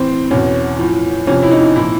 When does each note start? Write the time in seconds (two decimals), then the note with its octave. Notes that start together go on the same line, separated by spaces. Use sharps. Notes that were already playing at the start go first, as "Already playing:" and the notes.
Already playing: A2 E3 C4
0.31 E2 B2 C#4
0.79 A2 F3
1.27 F2 C3 F3 C#4
1.43 E4
1.51 D#4
1.75 A#2 F3 E4